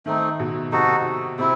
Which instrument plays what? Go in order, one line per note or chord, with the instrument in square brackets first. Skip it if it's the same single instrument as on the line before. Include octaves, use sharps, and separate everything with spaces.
[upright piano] D#3 [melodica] A3 C4 D#4
[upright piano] B2
[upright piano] C3 [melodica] D#4 F#4 A4
[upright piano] C3 [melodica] C4 E4